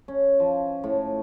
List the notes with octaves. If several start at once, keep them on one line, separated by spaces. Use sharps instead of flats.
C#4
F3
A2